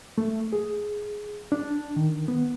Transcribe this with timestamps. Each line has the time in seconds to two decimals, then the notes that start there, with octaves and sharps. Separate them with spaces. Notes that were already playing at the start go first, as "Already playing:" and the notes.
0.18 A3
0.53 G#4
1.52 D4
1.96 D#3
2.28 B3